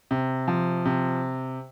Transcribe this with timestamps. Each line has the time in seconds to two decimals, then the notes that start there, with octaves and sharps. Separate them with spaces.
0.11 C3
0.48 F3
0.85 C3